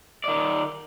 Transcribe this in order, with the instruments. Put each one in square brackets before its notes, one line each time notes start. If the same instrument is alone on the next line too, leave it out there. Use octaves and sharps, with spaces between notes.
[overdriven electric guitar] D#3 D5